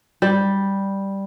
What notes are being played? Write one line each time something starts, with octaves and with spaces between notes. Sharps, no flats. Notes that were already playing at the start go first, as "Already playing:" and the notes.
G3